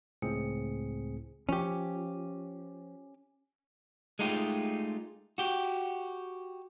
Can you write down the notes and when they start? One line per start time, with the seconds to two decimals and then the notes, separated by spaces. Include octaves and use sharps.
0.22 C#2 A2 G#3 C4 G#4 C#7
1.49 F3 C#4 G4
4.19 G#3 A3 D#4 F4 G4
5.38 F#4 G4